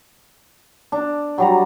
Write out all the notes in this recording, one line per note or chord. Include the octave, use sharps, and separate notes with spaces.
D4
F#3 G3 A#5